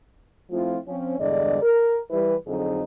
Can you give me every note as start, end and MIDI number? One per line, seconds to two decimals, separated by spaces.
0.51 0.77 53
0.51 0.77 57
0.51 0.77 60
0.51 0.77 64
0.51 0.77 65
0.88 1.17 53
0.88 1.17 60
0.88 1.17 61
1.19 1.61 40
1.19 1.61 43
1.19 1.61 50
1.19 1.61 56
1.19 1.61 74
1.19 1.61 75
1.62 1.98 70
2.11 2.35 52
2.11 2.35 55
2.11 2.35 71
2.47 2.82 41
2.47 2.82 50
2.47 2.82 54
2.47 2.82 60
2.47 2.82 63
2.47 2.82 68